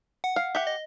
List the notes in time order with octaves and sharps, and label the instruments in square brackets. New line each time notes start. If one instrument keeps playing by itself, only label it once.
[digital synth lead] F#5
[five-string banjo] F5
[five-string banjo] G4 F#5 [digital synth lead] E5
[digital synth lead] D#5